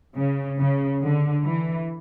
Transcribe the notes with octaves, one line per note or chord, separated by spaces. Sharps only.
C#3
C#3
D3
E3